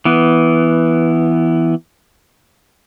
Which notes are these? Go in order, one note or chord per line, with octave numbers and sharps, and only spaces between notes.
E3 B3